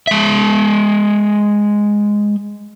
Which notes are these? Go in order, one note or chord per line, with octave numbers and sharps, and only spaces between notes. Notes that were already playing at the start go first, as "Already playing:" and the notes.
G#3 E5